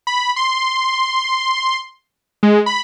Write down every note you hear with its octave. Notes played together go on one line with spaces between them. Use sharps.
B5
C6
G#3
B5